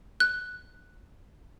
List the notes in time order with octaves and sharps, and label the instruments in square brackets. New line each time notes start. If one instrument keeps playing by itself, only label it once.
[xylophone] F#6